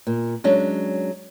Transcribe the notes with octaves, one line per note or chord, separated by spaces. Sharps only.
A#2
F#3 G#3 C#4 D4